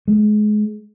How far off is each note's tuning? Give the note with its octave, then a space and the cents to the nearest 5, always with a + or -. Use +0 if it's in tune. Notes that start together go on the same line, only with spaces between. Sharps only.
G#3 +30